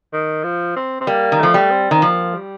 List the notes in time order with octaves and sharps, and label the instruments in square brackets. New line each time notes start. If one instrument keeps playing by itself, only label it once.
[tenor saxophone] D#3
F3
C4
C4
[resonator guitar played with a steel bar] G3 [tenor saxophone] A#3
[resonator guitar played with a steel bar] D#3
[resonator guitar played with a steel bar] F3 [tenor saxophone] A3
[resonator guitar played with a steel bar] G3
[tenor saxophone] C4
[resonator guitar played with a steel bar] D#3
[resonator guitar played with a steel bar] F3 [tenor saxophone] A#3
[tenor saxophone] G3